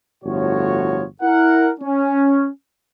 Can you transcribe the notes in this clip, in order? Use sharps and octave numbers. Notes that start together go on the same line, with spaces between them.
G1 A2 F3 F#4 C#5
E4 A#4 F#5
C#4